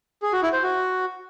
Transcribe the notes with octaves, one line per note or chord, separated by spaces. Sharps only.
G#4
F#4
E4
C5
F#4